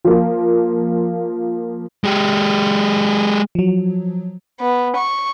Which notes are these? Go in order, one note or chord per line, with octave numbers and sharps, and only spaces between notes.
F3 A#3 F4
G#3 G4
F3 F#3
B3
C#6